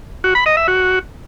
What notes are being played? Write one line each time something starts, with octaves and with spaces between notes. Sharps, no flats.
F#4
B5
D#5
E5
F#4